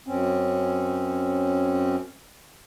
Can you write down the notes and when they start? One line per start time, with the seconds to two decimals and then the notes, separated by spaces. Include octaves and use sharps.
0.07 F#2 C4 C#4